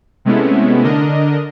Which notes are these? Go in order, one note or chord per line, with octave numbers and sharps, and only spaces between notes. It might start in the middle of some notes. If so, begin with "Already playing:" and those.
C3 G#3 A3 B3 C#4 E4
D3 D4 A#4 D#5